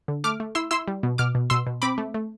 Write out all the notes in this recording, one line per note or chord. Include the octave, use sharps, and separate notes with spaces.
D3
A3 D6 F6
A3
E4 C6 E6
E4 C6 E6
G3
B2
B2 D6 F6
B2
B2 C6 E6
B2
C4 B5 D6
A3
A3